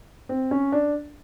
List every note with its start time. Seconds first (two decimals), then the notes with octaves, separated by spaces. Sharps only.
0.29 C4
0.51 C#4
0.72 D4